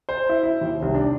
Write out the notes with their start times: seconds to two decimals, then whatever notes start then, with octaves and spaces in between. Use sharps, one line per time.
0.09 C5
0.29 E4
0.43 E4
0.61 D#2
0.82 C2
0.95 D4